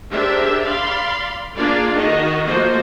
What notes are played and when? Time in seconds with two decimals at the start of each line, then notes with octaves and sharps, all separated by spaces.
0.11 D4 G4 G#4 A#4 C5 E5
0.64 D5 F5 B5 C6
1.56 A#3 D4 F4 G#4 D5 F5
1.94 D#3 F#4 D#5
2.46 F3 A3 A#3 F#4 C5 D#5